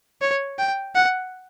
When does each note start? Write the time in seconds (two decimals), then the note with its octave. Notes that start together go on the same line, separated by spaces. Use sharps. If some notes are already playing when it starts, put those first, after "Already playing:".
0.22 C#5
0.58 G5
0.95 F#5